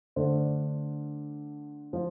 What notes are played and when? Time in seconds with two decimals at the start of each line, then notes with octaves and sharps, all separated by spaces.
0.16 D3 A3 D4 C5
1.93 F3